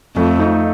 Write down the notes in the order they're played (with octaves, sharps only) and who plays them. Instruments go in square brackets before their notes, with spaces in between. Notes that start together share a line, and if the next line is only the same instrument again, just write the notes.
[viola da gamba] F2 [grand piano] A3
[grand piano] D#4